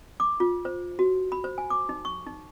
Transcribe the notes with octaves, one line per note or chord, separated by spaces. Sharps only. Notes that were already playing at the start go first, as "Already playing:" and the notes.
D6
F4
C5
F#4
B5
C5
G#5
D6
D#4
C#6
D#4